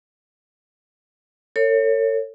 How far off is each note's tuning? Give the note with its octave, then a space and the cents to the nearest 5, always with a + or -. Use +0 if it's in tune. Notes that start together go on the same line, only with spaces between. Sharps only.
A4 +40 C#5 +0